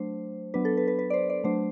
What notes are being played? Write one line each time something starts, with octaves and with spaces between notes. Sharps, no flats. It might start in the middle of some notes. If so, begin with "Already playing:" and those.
Already playing: F#3 A3 D4 C5
F#3 B3 D4 B4
A4
B4
B4
B4
D5
C5
D5
F#3 A3 D4 C5